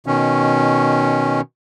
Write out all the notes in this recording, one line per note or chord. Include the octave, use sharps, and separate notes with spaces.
B2 D#3 C#4